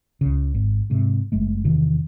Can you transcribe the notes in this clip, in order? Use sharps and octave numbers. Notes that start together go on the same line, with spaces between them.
C#2 C#3
G#1
G#2 C3
F#1 G#3 A3
E2 C3 D#3 E3